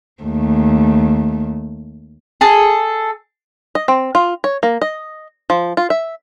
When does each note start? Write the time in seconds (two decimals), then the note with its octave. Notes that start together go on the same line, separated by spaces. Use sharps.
0.23 D#2 A3
2.41 G#4 A4
3.75 D#5
3.88 C4
4.15 F4
4.44 C#5
4.63 A#3
4.81 D#5
5.50 F3
5.77 F4
5.90 E5